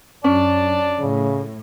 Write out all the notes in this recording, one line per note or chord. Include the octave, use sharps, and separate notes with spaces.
F#2 C#4 D5 A5
A2 C#3